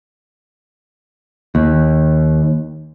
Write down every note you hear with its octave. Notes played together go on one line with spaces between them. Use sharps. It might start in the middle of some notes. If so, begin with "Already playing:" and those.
D#2